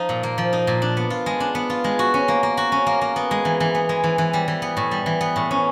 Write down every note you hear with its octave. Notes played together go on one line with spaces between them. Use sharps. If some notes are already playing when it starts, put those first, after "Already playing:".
Already playing: F3 D#4
A#2
A#3
F3
D#4
A#2
D4
B3
F4
G#3
D4
B3
F4
G#3
F#4
C#4
A#3
A#3
F#4
C#4
A#3
A#3
B3
G#3
E3
E3
B3
G#3
E3
E3
G3
E3
B3
A2
G3
E3
B3
A2
C#4